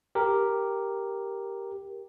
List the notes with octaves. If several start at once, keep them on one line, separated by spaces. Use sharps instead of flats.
G4 A#4